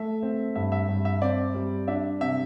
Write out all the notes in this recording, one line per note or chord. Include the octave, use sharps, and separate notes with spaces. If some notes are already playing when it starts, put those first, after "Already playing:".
Already playing: A3 E5
C4
G2 E5
E5
G2
E5
C4 D5
G3
D4 E5
C3 E5